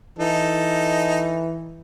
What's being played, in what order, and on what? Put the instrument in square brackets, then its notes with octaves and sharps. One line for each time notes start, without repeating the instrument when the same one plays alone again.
[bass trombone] E3 [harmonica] D#4 A4